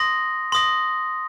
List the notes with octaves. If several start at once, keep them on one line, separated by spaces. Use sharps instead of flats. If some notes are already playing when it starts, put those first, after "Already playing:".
Already playing: C6 D#6 A#6
C6 D#6 A#6